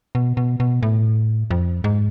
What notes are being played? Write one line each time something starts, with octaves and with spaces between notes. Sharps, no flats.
B2
B2
B2
A2
F2
G#2